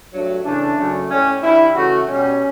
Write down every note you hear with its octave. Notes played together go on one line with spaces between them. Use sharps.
G2 F#3 A3
C#3 E3 A3 D4
F#2 C#3 F#3 A3
A2 G3 C#4
G2 E3 G3 E4
C#3 E3 A3 F#4
B2 G3 C#4